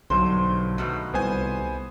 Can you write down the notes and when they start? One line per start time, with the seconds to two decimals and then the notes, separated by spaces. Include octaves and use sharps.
0.10 B1 G2 D3 C5
0.78 B2 D#3 A3
1.14 C2 B3 C5 G#5